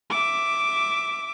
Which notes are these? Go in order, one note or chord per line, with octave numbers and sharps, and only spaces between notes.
E5 D6